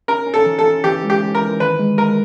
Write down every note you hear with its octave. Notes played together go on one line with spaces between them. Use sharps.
C#4 A#4
C#4
A4
E3
A4
C#4
E3 G4
G#3
G4
C#4
A#4
E3
D#3 B4
G#3
G#3 A#4